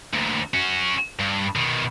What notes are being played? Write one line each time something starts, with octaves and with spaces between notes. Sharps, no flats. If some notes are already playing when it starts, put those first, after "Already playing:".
D2 A#2
C#4 F#4
G2
B2 D#3